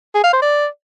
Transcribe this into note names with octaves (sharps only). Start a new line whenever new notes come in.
G#4
F5
C5
D5